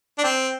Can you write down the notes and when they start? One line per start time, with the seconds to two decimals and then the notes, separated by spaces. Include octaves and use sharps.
0.18 D4
0.24 C4